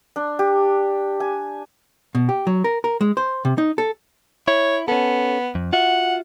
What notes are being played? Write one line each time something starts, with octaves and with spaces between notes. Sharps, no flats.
D4
G4
G#5
B2
G4
F#3
A#4
A#4
G#3
C5
C3
D#4
A4
E4 C#5
B3 C#4 A4
F2
F4 F#4 E5 F#5